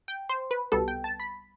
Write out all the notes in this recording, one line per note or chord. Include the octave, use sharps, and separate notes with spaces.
G5
C5
B4
C2 B2 G3 B3 A4
G5
A5
B5